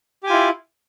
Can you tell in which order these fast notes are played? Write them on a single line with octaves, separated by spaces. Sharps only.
G4 G#5 F4 E4